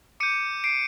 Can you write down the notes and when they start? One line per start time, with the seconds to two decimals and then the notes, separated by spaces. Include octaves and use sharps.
0.20 D6 G6 C#7 D#7
0.64 C7 D7